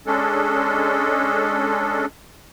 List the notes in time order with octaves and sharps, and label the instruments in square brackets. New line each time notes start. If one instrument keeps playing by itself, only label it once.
[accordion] G#3 C#4 D4 A4